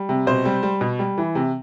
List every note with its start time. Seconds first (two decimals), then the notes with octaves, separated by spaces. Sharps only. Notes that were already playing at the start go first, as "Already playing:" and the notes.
Already playing: G3
0.09 C3
0.27 B2 C5
0.45 G3
0.63 G3
0.81 B2
0.99 G3
1.18 E3
1.35 C3